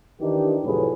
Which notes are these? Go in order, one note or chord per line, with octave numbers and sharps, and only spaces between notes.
D#3 E3 D4 D#4 G4
F2 A2 C3 F#3 G#4 B4